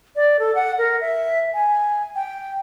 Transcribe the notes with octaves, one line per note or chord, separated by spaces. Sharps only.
D5
A4
F#5
A#4
E5
G#5
G5